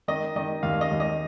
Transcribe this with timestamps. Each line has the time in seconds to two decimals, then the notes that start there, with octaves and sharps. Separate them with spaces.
0.08 D#3 D#5
0.36 D#3 D#5
0.63 D#2 F5
0.81 D#5
0.91 D#2
1.00 D#5